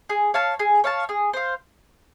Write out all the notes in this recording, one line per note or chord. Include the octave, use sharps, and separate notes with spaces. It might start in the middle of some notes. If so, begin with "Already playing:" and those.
G#4
C#5 F5 A5
G#4
C#5 F5 A5
G#4
C5 F5